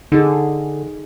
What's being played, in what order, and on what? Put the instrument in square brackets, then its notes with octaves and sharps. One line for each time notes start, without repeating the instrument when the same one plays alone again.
[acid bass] D3 [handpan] D#4 G#4